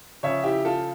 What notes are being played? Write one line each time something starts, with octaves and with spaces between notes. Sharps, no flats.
C#3 F3 C#5 E5
E4 G4
F4 A4